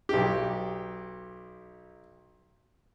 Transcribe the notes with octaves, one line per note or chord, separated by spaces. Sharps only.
B1 G4